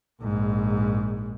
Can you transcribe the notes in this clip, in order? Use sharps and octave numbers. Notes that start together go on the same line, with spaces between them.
A#1 G#2